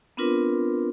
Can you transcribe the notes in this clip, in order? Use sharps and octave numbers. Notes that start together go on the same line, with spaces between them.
B3 C4 D4 F4 A#4 B4